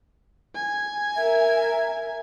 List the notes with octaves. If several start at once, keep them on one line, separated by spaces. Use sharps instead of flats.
G#5
A#4 E5